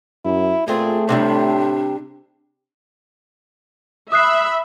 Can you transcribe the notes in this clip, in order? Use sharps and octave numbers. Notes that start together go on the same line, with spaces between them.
F#2 E4
A#2 A3 C4 F4 G#4
A2 C3 F#3 G3 D4
E5 B5 D#6 F#6 C7